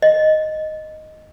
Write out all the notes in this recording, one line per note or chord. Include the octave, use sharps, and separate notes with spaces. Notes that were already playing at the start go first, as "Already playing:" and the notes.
D#5